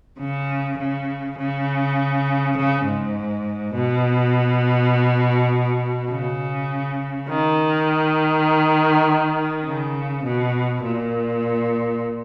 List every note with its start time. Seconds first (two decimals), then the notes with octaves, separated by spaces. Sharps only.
0.20 C#3
0.78 C#3
1.38 C#3
2.56 C#3
2.86 G#2
3.74 B2
6.10 C#3
7.29 D#3
9.65 C#3
10.24 B2
10.83 A#2